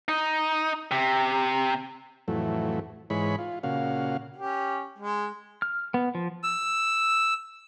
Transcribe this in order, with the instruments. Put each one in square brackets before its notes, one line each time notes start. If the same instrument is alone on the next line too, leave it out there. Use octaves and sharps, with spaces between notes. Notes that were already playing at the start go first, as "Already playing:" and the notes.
[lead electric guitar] D#4
C3
[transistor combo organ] F2 A2 E3 F#3 A3
G#2 E3 G#3 C#5 B5
F4
A#2 C#3 F#4 F5
[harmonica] C#4 G4
G#3
[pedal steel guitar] F6
B3
F3
[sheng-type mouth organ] E6